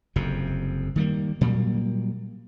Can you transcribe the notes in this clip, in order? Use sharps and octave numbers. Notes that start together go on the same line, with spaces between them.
F#1 F2 C3
D#3 G3 A#3
A#2 F#3 G3 A#3